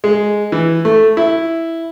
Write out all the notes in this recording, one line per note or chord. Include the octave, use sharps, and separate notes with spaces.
G#3
E3
A3
E4